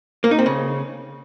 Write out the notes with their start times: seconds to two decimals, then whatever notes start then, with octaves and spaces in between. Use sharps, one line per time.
0.24 A#3
0.31 D#4
0.39 C4
0.46 C#3